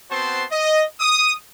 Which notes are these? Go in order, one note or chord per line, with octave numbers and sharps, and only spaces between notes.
B3 C4 F#4 C5 A5 C6
D#5
D#6